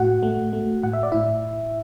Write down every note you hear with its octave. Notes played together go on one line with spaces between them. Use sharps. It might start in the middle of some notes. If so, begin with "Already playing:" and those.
Already playing: A2 F#4 F#5
A3
A3
A2 F#5
E5
D5
A2 E4 E5